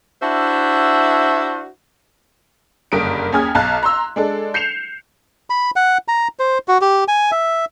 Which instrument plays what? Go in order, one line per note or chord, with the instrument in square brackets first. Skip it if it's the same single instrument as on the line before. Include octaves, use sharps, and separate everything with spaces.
[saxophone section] D4 E4 F#4 C5 E5
[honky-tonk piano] F#1 G2 D3 A#4 D#6 D7
D#2 C#4 G#4 D#6 F6 G#6
B1 F5 A5 A#5 F#6
A#5 C6 E6
G#3 D4 A4
G6 C7 C#7 E7 F7
[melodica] B5
F#5
A#5
C5
F#4
G4
G#5
E5